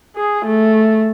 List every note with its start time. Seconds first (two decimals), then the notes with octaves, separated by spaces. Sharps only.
0.16 G#4
0.45 A3